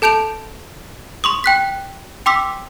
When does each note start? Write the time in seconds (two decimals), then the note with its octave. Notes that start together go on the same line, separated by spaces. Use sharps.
0.02 A4 A5 G6 D7 F7
1.24 C6 C#6 D#6
1.44 G5 F#6 B6
2.26 G5 C6 D6 E6 B6